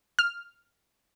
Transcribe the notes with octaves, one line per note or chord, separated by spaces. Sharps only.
F6